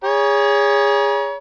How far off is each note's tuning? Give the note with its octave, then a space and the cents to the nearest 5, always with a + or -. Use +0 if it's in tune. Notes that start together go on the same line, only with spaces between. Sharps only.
G#4 -20 C#5 +25 A#5 +45